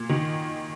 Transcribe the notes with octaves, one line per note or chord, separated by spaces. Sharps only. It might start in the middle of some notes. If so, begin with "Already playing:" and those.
Already playing: A#2
D#3